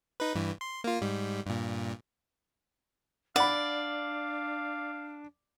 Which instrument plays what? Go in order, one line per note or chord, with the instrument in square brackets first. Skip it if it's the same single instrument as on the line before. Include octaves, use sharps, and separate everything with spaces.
[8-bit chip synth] D#4 B4
G2 E3
C6
A#3 F4
G#2 G3
G2 A#2
[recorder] D4 [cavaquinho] D5 [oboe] F5 [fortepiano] F#5 B5